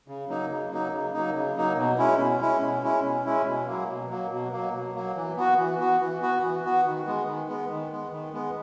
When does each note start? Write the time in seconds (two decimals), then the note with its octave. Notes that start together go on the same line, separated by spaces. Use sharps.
0.08 C#3
0.29 F#3 A#3 D#4
0.50 C#3
0.71 F#3 A#3 D#4
0.93 C#3
1.13 F#3 A#3 D#4
1.35 C#3
1.56 F#3 A#3 D#4
1.77 B2
1.98 G#3 C#4 E4
2.19 B2
2.41 G#3 C#4 E4
2.61 B2
2.83 G#3 C#4 E4
3.04 B2
3.25 G#3 C#4 E4
3.46 B2
3.67 F#3 A#3
3.89 B2
4.10 F#3 A#3
4.31 B2
4.52 F#3 A#3
4.74 B2
4.95 F#3 A#3
5.16 E3
5.37 B3 F#4
5.58 E3
5.79 B3 F#4
6.01 E3
6.22 B3 F#4
6.43 E3
6.64 B3 F#4
6.85 D#3
7.06 G#3 B3
7.27 D#3
7.48 G#3 B3
7.70 D#3
7.91 G#3 B3
8.12 D#3
8.33 G#3 B3